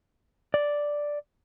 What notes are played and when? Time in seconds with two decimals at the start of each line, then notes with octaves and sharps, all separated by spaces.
0.54 D5